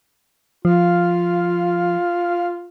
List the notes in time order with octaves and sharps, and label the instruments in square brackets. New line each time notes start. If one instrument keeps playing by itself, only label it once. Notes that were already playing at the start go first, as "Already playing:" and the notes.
[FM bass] F3 [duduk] F4 [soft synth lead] F5